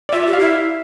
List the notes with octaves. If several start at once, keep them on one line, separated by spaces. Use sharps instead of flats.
D5
F4 E5
E5
G4
F5
E4 E5